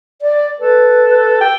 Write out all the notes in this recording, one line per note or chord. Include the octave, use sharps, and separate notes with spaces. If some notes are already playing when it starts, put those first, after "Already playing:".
D5
A4 B4
G5